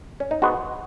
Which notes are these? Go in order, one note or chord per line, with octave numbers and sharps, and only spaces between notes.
C#4
D#4
G#2 G#3 B3 F#4